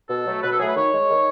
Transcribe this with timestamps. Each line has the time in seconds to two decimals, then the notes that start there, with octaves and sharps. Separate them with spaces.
0.09 B2 A4
0.26 F#3 A3
0.42 B2 B4
0.51 A4
0.59 F#3 A3 G#4
0.67 B4
0.75 D#3 C#5
0.92 G#3
1.08 D#3